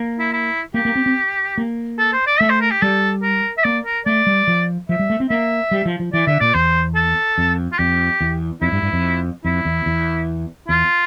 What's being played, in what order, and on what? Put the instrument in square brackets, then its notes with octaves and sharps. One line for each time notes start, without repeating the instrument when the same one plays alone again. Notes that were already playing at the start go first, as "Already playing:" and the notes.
Already playing: [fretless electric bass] A#3
[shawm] E4
E4
[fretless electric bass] A#3 [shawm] G4
[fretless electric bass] A#3
C4
C4
A#3
[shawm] A4
C5
D5
[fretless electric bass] A3 [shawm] E5
[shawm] C5
A#4
G4
[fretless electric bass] G3 [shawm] A4
[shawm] A#4
E5
[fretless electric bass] A#3 [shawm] D5
[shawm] A#4
[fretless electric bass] A3 [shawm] D5
[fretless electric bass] G3
F3
[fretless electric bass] F3 [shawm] E5
[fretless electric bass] G3
A3
C4
[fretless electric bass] A#3 [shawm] E5
[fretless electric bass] G3
F3
F3
[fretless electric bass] E3 [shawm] D5
[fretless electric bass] D3 [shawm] E5
[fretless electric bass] A#2 [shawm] D5
[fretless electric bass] E2 [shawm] C5
[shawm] A4
[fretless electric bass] F2
[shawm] F4
[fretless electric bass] F2 [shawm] G4
[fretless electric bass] E2
[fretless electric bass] F2 [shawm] E4
[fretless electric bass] G2
G2
F2
[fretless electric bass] F2 [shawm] E4
[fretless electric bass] E2
E2
[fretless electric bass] E2 [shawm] F4